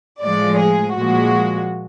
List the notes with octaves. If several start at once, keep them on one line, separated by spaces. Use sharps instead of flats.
A2 F3 G#3 D5
G#4
A#2 F3 G#3 F#4